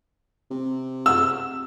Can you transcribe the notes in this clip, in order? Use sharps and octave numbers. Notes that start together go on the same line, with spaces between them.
C3
E6